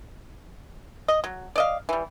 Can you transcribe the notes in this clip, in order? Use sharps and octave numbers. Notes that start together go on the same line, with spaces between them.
D#5
F#3
D5 D#5 F5
E3 G3